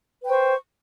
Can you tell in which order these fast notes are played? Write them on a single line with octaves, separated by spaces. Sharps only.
B4 G5 C5 C#6